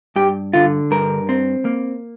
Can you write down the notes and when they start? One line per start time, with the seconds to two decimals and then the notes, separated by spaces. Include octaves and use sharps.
0.16 G2 G4
0.53 D3 F4
0.91 G2 A#4
1.29 C4
1.65 A#3